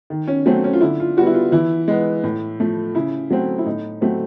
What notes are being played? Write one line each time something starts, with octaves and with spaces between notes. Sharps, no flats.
D#3
C#4
F#3 A3 C4 C#4
C#4
F4
D3 E4
F4
G3 B3 F#4
E4
F4
E3 E4
G#3 B3
A2
F3 A3
C#3 E4
F#3 A3 C4
E4
A2 D#4
F#3 A3 C4